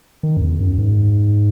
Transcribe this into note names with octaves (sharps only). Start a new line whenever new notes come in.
D#3
F#2
E2
F#2
G#2